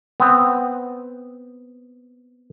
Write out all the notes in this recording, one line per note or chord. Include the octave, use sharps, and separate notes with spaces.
B3 C4